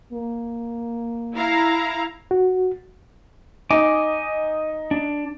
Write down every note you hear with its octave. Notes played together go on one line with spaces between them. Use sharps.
A#3
E4 F5 A#5
F#4
D#4 D#5 G#5 D6
D4